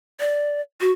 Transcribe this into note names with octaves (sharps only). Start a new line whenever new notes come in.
D5
F#4